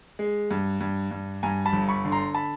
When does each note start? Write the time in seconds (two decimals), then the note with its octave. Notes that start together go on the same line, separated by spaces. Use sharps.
0.19 G#3
0.51 G2
0.81 G2
1.11 G2
1.43 G2 G#5 A#5
1.65 A5 B5
1.73 G1
1.89 B5 C#6
2.05 D3
2.11 A#5 C6
2.35 A5 B5